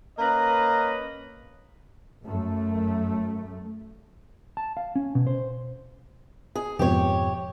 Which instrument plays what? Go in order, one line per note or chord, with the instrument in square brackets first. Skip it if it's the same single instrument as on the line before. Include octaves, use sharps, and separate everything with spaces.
[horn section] A#3 C#4 B4 D#5
[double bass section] F#2 A3
[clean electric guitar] A5
F5
C#4
B2
C5
[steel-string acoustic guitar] G#4
[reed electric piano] F2 G#2 B2 [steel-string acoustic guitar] G4 C#5